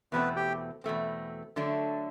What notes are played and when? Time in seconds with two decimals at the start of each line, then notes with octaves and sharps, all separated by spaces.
0.12 E2 B2 A3 B3 C4 B4
0.36 G4 G5
0.84 E2 B2 A3 C4
1.56 D3 F#3 A3 D4